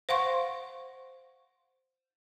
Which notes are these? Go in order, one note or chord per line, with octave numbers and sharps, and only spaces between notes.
C5 F5 F#5 C6 C#6